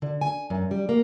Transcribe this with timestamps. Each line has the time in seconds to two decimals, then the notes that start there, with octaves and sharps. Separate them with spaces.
0.02 D3
0.21 G#5
0.50 F#2
0.71 G3
0.89 A#3